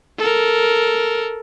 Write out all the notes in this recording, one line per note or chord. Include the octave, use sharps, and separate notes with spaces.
A4 A#4